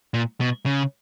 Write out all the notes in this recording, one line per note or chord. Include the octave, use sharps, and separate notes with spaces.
A#2
B2
C#3